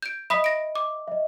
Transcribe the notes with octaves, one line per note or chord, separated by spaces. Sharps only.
G6 D7
D#5 E5 B5 D#6 B6
A#6 D7
D6
D#5 E5